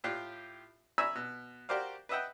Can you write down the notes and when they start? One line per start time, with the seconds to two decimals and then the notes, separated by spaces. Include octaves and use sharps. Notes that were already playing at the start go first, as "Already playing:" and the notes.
0.04 A2 F4 G4 F#6
0.98 E5 G#5 A#5 B5 C#6 E6
1.15 B2
1.69 F#4 G4 A#4 C5 D5 F5
2.09 B4 D#5 E5 F#5 G5